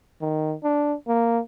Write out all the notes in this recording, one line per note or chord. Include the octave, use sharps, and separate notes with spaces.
D#3
D4
A#3